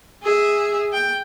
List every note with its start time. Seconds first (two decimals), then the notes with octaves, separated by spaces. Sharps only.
0.23 G#4 E5
0.93 G5